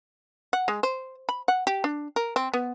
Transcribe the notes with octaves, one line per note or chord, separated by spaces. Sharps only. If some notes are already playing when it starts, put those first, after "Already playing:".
F#5
G#3
C5
B5
F#5
G4
D4
A#4
C4
B3